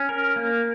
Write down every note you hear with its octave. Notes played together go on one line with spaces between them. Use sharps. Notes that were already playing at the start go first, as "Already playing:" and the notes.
Already playing: C#4
A#4
A#3